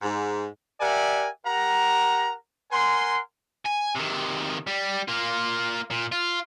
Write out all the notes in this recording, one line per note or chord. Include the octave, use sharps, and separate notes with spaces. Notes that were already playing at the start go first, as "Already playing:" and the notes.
G#2
G4 A#4 D5 E5 F#5 G#5
G4 A#4 F#5 A#5
A#4 F#5 G#5 C6
G#5
C3 D#3
G3
A#3 F4
A#2
F4